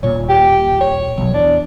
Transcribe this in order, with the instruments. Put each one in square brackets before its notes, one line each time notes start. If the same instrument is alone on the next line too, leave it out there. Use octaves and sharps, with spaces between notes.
[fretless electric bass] D#1 A#2 [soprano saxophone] C#5
[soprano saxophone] G4
C#5
[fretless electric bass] B1 F#3
[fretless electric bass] E2 [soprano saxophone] D4